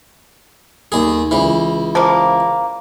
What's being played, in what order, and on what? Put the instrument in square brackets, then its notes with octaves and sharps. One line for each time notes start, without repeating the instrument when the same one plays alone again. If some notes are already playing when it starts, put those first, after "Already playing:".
[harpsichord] D#2 G#4
C#2 E3
[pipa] F3 G3 A#3